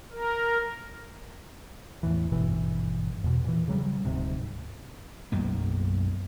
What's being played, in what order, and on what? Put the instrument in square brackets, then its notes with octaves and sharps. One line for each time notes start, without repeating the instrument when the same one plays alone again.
[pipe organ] A#4
[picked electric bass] E2 A2 E3
G#1 G2 B2 E3
E2 B2
A#2 E3
C#3 F#3 G3
D1 D2 G#2 C3
[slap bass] B1 F#2 A#3